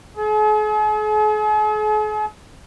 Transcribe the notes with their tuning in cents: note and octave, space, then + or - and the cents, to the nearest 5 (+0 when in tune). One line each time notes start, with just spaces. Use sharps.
G#4 +45